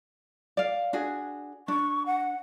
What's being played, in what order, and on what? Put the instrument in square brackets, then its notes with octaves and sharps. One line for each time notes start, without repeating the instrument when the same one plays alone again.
[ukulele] D5 F5
D4 F#4 G#4
[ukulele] D4 [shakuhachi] C#6
[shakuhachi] F#5